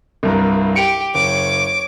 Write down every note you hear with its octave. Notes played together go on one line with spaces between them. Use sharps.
C2 G2 A#4
G4 C#7 D7 F7
F#1 C#5 D6